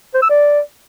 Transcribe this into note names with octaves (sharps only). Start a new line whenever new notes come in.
C5
E6
D5